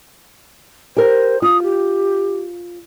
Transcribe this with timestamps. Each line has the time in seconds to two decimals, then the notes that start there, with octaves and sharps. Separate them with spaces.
0.97 G4 A#4 C5
1.42 F4 D#6
1.63 G4